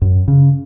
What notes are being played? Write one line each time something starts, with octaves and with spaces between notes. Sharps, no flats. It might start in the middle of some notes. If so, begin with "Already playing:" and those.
F#2
C#3